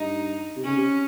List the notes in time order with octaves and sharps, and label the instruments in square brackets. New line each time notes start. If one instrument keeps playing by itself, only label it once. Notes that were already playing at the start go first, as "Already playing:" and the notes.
Already playing: [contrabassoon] G2 [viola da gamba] D#4
[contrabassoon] C3
[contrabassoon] C#3 [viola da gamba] C#4
[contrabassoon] C3